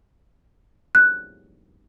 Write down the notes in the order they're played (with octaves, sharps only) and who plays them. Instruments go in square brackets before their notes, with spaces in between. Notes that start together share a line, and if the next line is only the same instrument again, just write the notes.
[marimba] F#6